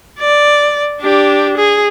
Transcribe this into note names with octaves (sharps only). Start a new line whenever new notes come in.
D5
D4 G4
G#4